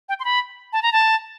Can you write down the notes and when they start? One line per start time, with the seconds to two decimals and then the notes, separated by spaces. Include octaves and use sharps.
0.09 G5
0.20 C6
0.25 B5
0.73 A5
0.83 A#5
0.92 A5